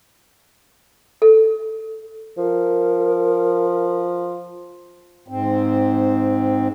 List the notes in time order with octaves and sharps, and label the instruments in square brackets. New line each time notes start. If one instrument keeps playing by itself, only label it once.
[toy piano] A4
[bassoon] F3 [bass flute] A#4
[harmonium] G#2 C4